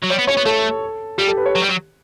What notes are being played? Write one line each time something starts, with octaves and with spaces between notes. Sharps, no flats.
F#3
G3 C#5
B3
C#4 C#5
B3
A3 A4
G3 G4
A4
B4
C#5
F#3
G3
F#3